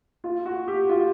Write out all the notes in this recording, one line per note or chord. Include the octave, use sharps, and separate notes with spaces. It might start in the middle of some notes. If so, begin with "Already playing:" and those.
F4
F#4
G4
F4